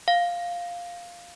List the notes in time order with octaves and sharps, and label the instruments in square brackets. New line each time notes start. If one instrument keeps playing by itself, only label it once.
[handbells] F5